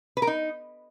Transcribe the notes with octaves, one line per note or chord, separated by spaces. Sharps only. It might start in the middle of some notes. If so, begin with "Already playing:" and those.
B4
A#4
D#4